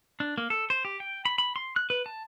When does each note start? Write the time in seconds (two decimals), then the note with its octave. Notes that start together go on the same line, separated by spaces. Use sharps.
0.20 D4
0.38 A#3
0.50 A4
0.70 C5
0.85 G4
1.00 G5
1.25 B5
1.38 B5
1.56 C6
1.76 F#6
1.90 B4
2.06 A5